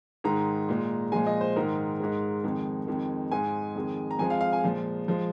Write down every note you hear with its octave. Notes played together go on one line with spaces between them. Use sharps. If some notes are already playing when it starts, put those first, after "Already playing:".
G#2 D#3 G#3 A#5
A#2 G#3
A#2 F3 G#3 G#5
D#5
C5
G#2 D#3 G#3 A#4
G#2 G#3
F2 D#3 G#3
F2 D#3 G#3
G#2 G#3 G#5
F2 D#3 G#3
A#5
F2 F3 G#3 G#5
F5
F5
G#5
A#2 F3 G#3
F3 G#3